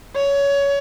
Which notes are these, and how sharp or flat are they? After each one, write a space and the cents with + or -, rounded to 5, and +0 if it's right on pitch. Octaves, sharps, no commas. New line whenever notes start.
C#5 +20